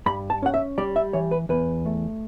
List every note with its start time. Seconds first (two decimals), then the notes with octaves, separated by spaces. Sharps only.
0.06 G2 B5
0.30 A5
0.42 C#4 F#5
0.54 E5
0.78 G3 D5
0.96 E5
1.13 E3 C#5
1.31 B4
1.49 E2 B4
1.86 A3